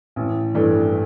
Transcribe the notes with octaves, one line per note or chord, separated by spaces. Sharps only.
A1
G2 E3 A3 D4